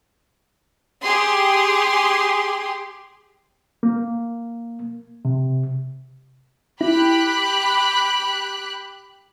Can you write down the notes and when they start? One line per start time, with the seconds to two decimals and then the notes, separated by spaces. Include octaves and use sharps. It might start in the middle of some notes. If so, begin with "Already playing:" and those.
1.02 G4 G#4 C6
3.83 A#3
5.25 C3
6.81 E4 G4 B5 F#6